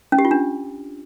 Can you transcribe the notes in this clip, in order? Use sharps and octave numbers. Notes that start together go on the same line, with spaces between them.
C#4
G4
F4
D4